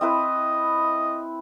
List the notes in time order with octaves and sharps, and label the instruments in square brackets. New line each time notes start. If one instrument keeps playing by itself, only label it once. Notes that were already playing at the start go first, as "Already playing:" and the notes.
[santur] C4 E4 B4 [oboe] D#5